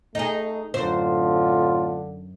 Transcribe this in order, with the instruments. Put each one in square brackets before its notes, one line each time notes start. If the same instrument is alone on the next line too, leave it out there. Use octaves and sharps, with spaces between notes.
[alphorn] A3 [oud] D#4 G#4
[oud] F#2 C5 [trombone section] A2 C4 F4 [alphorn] D3